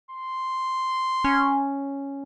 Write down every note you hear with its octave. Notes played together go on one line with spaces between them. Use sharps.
C6
C#4